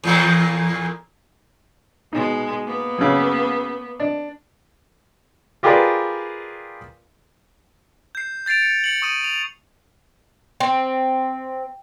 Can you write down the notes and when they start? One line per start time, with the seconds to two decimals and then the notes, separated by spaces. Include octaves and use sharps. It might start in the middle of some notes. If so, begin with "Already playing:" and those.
0.04 E2 A#2 A#3
2.13 B2 G#3 D#4
2.65 A#3 B3
2.98 F#2 C#3
4.00 D4
5.63 F4 G4 G#4 A#4 B4 D5
8.15 G6 C7
8.46 G6 A6 C7 D7 F7
8.62 C#7
8.84 C#7 F#7
9.02 C#6 D#6 D#7
9.24 F7
10.60 C4